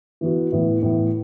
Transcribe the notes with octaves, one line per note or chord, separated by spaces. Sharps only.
E3 B3 F#4
A2 E3 B3
A2 E3 B3